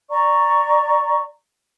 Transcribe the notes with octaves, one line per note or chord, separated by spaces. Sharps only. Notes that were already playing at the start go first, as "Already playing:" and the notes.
D5 A#5 C#6